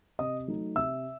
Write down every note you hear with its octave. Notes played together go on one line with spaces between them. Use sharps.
C3 D#5 D#6
F#3 A3 D#4
C3 E5 E6